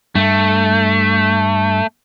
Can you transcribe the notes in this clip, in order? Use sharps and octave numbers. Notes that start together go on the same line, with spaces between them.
G2 A3